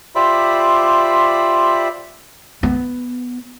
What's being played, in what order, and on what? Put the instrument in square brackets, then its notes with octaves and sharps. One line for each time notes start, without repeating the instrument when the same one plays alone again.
[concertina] F4 G4 C5 D5 E5 B5
[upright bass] B3